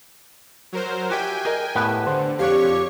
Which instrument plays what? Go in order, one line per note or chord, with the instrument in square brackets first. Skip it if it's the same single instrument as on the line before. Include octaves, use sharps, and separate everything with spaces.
[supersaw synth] F#3 A#4 C5
[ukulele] F#4 G4 E5 [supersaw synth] G5 G#5
[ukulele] G#4 A#4 D#5
[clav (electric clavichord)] A2 B3 F#5 [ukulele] G4 B4 A5
[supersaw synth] D3 [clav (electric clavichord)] C5 F#5
[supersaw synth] F2 C#5 C#6 [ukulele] D4 F5 [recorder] G4